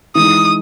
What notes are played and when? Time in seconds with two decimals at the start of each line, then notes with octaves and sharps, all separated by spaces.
0.15 E3 G#3 D#4 D#6